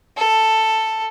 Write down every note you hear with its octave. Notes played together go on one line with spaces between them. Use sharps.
A4